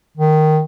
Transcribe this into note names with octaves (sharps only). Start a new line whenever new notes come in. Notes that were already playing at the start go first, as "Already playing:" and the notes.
D#3